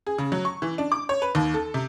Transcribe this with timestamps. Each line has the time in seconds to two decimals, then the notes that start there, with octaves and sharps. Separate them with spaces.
0.07 G#4
0.18 C#3
0.32 F#3
0.45 C#6
0.62 E3
0.78 D4
0.92 D6
1.09 C#5
1.22 B4
1.35 D#2
1.54 A4
1.74 C3